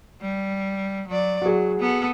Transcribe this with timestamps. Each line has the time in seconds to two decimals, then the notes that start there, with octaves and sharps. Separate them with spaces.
0.22 G3
1.08 F#3 D5
1.42 F#3 F#4 G#4
1.80 B3 A4